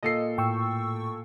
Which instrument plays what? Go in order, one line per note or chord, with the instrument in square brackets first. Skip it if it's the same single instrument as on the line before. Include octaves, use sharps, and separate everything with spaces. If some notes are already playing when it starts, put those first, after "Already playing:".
[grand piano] A#2 A4 C7 [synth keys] D#5
[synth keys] A2 [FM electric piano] G5 C#6 E6